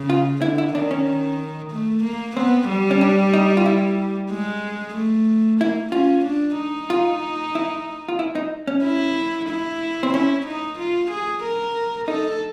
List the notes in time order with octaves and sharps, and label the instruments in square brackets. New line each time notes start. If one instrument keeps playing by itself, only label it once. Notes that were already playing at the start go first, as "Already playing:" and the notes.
Already playing: [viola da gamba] C#3
[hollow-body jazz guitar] F4
[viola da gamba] D3 [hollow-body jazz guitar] E4
[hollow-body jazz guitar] E4
[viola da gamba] D#3 [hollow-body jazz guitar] D4
[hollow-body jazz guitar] C#4
[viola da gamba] A3
A#3
[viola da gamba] B3 [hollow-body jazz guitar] C4
[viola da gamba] G3
[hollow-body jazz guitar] C#4
D4
D#4
F4
E4
[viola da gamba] G#3
A3
[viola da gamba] A#3 [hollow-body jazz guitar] E4
[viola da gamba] C#4 [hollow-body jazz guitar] F4
[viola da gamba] D4
D#4
[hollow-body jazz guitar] F4
E4
F4
E4
D#4
C#4
[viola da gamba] E4
E4
[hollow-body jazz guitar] C4
[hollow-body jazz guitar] C#4 [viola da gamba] E4
[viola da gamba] D#4
F4
G#4
A#4
[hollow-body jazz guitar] D#4 [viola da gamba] A4